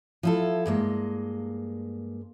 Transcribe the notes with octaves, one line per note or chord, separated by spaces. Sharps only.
F3 E4 A4
G2 G#3 A#3